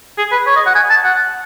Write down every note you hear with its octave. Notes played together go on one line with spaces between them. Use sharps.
G#4
B4
C#5
D#5
F#5
G#5
A5
F#5